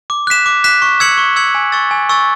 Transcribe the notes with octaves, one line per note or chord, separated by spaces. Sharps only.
D6
F#6 B6 E7
D6
F#6 B6 E7
C#6
E6 G#6 C#7 F#7
C#6
E6 G#6 C#7 F#7
G#5
C#6 E6 A6
G#5
C#6 E6 A6